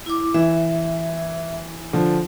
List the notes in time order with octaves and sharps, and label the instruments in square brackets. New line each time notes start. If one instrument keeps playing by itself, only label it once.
[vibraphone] E4 D6
[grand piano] E3 [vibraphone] E5
[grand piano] D3 F3